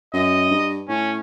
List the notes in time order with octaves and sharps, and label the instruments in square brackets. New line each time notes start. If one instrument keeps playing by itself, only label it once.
[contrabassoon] F#2 [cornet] D#5
[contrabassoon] G2
[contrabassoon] A2 [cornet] C#4